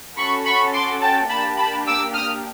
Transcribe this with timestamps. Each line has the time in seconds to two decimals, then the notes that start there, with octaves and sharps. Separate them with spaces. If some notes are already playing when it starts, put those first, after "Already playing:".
0.17 C#4 F#4 A4 B5 C#6
0.45 B5 C#6
0.73 C6 D6
1.01 G5 A5
1.29 A#3 D4 G4 A5 B5
1.57 A5 B5
1.86 D6 E6
2.14 D#6 F6